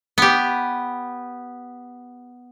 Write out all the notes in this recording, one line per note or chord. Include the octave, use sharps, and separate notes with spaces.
B3 G4